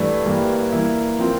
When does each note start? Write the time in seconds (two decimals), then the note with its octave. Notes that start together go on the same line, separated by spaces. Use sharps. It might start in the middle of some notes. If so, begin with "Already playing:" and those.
Already playing: G2 E3 A3 D4
0.26 G2 E3 G3 A#3
0.72 E3 A#3 E4
1.19 F3 C4 F4 A#4